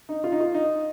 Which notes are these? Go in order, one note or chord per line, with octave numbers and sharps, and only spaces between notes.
D#4
F4
D#4
F4
D#4